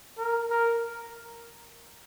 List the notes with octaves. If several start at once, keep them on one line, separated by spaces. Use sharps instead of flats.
A#4
A#4